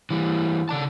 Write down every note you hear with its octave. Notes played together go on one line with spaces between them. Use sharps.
E3 G3
C#3 D5 A5